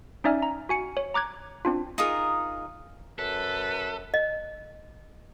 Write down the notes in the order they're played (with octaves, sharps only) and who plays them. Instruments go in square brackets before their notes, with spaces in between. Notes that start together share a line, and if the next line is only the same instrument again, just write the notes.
[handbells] C#4 D#4 D5 E5 G#5 F6
A#5
F#4 G#5 C#7
C#5
A#5 D6 F#6 G#6
C4 D4 F4
[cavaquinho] D#4 F4 G#4 A#4
[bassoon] F#2 [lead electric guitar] A4 [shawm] B4
[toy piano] D#5